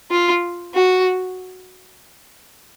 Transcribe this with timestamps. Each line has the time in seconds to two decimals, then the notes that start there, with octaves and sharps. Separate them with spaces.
0.11 F4
0.75 F#4